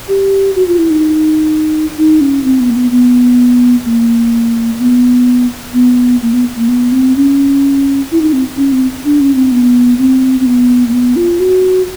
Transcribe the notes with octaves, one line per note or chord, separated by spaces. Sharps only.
G4
F#4
F4
E4
D#4
D#4
C#4
C4
B3
A#3
B3
B3
A#3
B3
B3
A#3
B3
A#3
B3
C4
C#4
E4
D#4
C4
C#4
C4
D4
C#4
C4
B3
C4
C4
B3
A#3
B3
F4
F#4